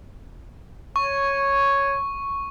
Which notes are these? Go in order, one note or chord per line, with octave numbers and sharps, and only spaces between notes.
C#5 C#6